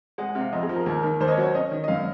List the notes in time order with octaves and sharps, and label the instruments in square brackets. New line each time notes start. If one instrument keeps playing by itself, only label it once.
[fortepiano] G#3 [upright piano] F#5
[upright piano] F#5
[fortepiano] C3
[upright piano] F5
[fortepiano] F2 [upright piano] D#5
[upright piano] G#4
[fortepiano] F3
[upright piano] A#4
[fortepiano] D#2 [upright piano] A#4
[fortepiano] D#3
[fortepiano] D#2 [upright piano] C5
[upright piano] D#5
C#5
[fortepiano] F#3
[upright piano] C#5
[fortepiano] C#4 [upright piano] D#5
[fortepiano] D#3
[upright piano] D#5
[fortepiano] F#2 [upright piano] F5